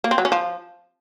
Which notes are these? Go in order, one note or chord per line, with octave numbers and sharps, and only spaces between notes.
A#3
C4
F#3
C#4
F3